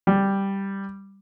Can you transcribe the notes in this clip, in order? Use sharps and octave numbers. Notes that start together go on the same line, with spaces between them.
G3